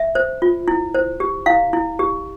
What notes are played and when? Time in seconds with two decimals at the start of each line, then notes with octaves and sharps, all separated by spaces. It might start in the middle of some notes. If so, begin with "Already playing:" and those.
Already playing: E5
0.15 C5
0.42 F4
0.68 E4
0.95 C5
1.20 G4
1.46 E4 F5
1.73 E4
1.99 G4